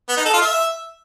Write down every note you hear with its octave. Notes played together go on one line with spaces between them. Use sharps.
B3
D#4
A4
F4
E5